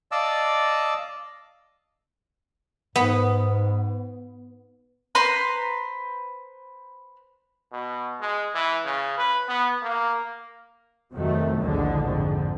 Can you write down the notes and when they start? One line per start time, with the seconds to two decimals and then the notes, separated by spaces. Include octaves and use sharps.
0.12 D5 D#5 F5 A5 D6 E6
2.96 G#2 B3
5.15 B4 C5 A#5 C6
7.72 B2
8.21 G#3
8.55 E3
8.85 C#3
9.18 B4
9.48 B3
9.82 A#3
11.14 F2 C3 D#3 F#3 A3
11.61 A#1 D#2 A2 D3 G#3
12.04 F2 G#2 D3